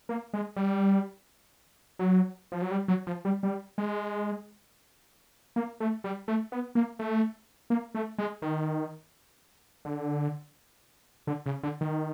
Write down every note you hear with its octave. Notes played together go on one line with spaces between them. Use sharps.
A#3
G#3
G3
F#3
F3
F#3
G3
F#3
F3
G3
G3
G#3
A#3
A3
G3
A3
B3
A#3
A3
A#3
A3
G#3
D#3
D3
D3
C#3
D3
D#3